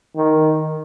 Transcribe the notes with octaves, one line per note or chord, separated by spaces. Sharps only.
D#3